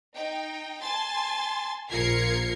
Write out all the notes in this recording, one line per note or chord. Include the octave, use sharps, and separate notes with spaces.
D#4 G5
G#5 A5 C6 A6
A#1 F4 A#4 G#6 C7 C#7